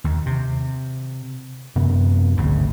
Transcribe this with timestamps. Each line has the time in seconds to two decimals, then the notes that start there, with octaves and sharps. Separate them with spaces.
0.04 D#2
0.26 C3
1.76 F#2 C3 B3
2.37 G#1 D2 C#3